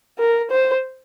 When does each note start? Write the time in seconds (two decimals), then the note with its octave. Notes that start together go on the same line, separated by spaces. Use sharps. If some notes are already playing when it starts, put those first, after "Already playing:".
0.19 A#4
0.50 C5